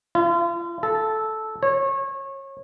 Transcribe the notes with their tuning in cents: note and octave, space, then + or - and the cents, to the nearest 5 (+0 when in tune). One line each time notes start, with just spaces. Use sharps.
F4 -40
A4 -10
C#5 -25